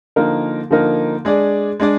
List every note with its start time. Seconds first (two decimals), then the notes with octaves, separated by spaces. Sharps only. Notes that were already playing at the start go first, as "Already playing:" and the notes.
0.16 D3 F3 A#3 D#4 A#4
0.70 D3 F3 A#3 D#4 A#4
1.25 G#3 D4 G#4 D5
1.80 G#3 D4 G#4 D5